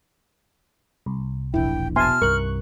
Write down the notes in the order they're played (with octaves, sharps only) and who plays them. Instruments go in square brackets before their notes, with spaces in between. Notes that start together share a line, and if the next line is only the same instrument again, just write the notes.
[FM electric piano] C2
[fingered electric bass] E1 A#1 D4 [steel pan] E4 [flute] G5
[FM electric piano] B2 A5 [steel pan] E5 G#5 C6 [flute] F6
[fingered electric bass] C2 G2 [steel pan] A#4 [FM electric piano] C#6 F#6